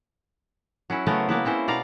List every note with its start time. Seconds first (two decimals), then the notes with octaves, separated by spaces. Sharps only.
0.90 F#3 C#4 E4
1.06 C#3 F#3 A3 B3 A#4 C5
1.29 G#3 A#3 B3 E4
1.45 C4 C#4 E4 C5
1.68 B2 D5 F5 A#5